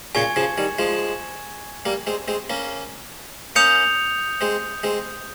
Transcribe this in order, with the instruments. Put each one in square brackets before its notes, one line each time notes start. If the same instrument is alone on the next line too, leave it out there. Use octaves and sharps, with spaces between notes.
[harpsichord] A#2 C#3 [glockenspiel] G#5 C#6 G#6 C#7
[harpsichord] C#3 F3
D#3 G3
F3 G#3
G3 A#3
G#3 C4
G#3 C4
A#3 C#4
[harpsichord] A#3 C#4 [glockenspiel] D#6 G6 C#7 F7
[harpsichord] G#3 C4
G#3 C4